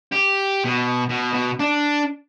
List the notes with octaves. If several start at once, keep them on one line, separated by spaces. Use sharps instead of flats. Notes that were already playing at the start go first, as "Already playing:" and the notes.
G4
B2
B2
B2
D4